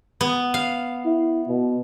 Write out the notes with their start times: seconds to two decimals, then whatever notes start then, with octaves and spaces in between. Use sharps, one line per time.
0.21 B3
0.54 F5
1.06 E4
1.48 B2